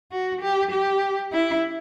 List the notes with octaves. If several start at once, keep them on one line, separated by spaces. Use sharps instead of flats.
F#4
G4
G4
E4